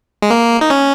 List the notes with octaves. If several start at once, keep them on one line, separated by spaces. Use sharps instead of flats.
G#3
A#3
D#4
C#4